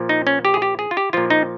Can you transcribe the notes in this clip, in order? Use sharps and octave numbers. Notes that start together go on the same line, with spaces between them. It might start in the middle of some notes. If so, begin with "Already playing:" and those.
Already playing: A#2 F3
D#4
C#4
G4
G#4
G4
G#4
F4
G4
A#2 F3 F4
D#4